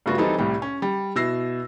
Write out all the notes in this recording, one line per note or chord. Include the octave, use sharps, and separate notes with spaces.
G2 C#3 A3 B3 F4 F#4
E3 G3 C4 D#4 A4
C2 A2 G3
C#4
G3
B2 E4 E6 A#6 C7